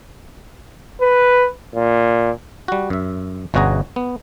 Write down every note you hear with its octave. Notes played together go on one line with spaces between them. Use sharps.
B4
A#2
G3 F#4
F#2 E5
G1 B2 C#4 F#4 G#4 A#5
B3